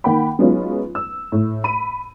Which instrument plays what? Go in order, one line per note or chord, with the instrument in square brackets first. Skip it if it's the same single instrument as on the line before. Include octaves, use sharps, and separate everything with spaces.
[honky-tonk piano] D#3 A#3 F#5 G5 B5
F#3 G#3 B3 C#4 D#4 F4
E6
A2
B5 D#7